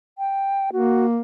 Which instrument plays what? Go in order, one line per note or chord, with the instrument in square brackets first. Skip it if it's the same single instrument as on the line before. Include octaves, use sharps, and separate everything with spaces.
[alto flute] G5
[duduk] A#3 [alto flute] F#4